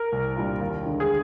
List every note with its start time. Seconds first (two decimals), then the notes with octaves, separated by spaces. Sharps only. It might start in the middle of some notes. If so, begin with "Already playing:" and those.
Already playing: A#4
0.12 C2
0.36 A#2 G3 D4 F4
0.61 D#2
0.85 D3 G#3
1.00 G#4